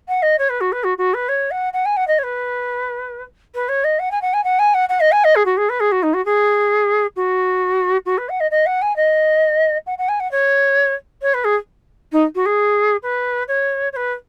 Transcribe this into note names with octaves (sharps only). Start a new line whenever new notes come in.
F#5
D#5
C#5
B4
F#4
B4
F#4
F#4
B4
C#5
F#5
F#5
G#5
F#5
D#5
C#5
B4
B4
C#5
D#5
F#5
G#5
F#5
G#5
F#5
G#5
F#5
F#5
D#5
G#5
D#5
G#4
F#4
G#4
B4
G#4
F#4
D#4
F#4
G#4
F#4
F#4
B4
F#5
D#5
D#5
F#5
G#5
D#5
F#5
F#5
G#5
F#5
C#5
C#5
B4
G#4
D#4
F#4
G#4
B4
C#5
C#5
B4